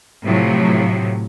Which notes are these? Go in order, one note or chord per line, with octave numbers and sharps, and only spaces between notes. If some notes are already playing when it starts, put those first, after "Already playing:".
A2 C3 F3 F#3